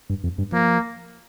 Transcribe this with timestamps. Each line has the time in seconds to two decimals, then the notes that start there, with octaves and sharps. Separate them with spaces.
0.10 G2
0.24 F2
0.38 G2
0.52 F3 A#3